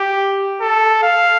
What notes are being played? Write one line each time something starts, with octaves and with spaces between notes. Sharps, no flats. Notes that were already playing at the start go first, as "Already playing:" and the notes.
Already playing: G4
A4
F5